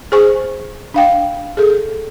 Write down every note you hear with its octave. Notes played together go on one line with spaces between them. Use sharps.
G#4 C5 G#5 C#6
D4 F5 G5
G#4 A4